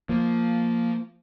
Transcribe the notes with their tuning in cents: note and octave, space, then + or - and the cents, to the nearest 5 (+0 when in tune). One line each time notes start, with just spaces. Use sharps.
F3 +0 A#3 -10